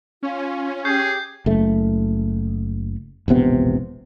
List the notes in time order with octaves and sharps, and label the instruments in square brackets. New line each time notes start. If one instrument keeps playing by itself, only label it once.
[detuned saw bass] C#4 [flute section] F4
[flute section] G4 [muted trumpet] G#4 [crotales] G6 C7
[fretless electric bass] F#1 A3
E1 A#1 C3 B3